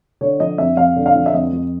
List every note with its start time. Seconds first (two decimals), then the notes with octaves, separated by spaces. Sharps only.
0.21 D3 C#5
0.40 F3 D#5
0.58 F2 E5
0.77 F2 F5
0.96 D3
1.06 F5
1.15 F3
1.26 E5
1.34 F2 D#5
1.53 F2